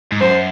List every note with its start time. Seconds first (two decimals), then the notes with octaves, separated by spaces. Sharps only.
0.12 G#2
0.21 F#2 C5